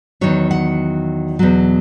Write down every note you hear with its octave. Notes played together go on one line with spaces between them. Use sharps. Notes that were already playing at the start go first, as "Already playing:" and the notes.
E2 D#3 F#3 C#5
F#5
E2 B2 F#3